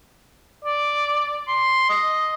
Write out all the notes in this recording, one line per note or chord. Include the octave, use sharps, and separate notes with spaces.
D5
C6
D#5